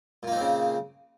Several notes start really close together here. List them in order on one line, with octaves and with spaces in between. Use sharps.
A#2 A#3 D#4 C4 C#3